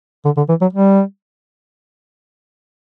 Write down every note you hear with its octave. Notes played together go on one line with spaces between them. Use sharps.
D3
D3
E3
F#3
G3